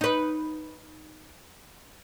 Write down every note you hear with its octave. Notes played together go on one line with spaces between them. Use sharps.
D#4 B4